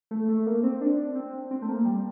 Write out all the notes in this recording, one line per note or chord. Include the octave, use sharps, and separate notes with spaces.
A3
A3
A#3
C4
D4
C4
C4
A3
A#3
G3